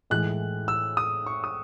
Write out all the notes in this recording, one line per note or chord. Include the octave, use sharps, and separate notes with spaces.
A2 E3 G#3 F#6
E6
D#6
C#6
D#6